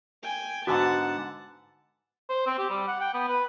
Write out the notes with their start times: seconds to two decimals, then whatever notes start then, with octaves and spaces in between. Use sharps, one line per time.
0.23 G5 G#5
0.67 G#2 D3 B3 F#4 F#5 A5
2.29 C5
2.46 C4
2.58 G4
2.70 G3
2.88 F#5
3.00 G5
3.14 B3
3.28 B4